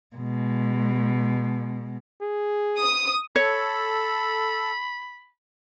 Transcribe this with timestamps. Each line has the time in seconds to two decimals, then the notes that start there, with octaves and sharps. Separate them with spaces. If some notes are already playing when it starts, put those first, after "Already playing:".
0.16 B2 G#3
2.22 G#4
2.80 D#6
3.36 A4 C#5 B5